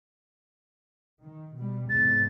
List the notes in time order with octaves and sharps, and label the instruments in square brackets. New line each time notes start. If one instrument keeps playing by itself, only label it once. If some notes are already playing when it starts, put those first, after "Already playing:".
[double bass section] D#3
B2 G3
[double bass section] E2 G#2 C3 [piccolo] A6